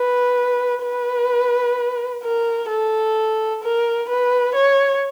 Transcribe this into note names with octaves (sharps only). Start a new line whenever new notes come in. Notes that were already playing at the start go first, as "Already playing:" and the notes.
Already playing: B4
B4
A#4
A4
A#4
B4
C#5